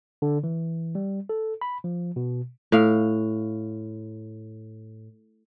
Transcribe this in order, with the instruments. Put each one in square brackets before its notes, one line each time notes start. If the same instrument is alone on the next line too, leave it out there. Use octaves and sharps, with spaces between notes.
[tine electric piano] D3
E3
G3
A4
B5
F3
B2
[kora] A2 F5